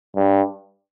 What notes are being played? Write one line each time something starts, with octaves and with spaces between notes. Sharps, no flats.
G2